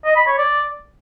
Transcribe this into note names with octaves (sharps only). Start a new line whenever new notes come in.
D#5
B5
C#5
D5